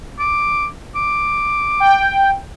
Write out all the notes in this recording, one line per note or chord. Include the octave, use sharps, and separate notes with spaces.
D6
D6
G5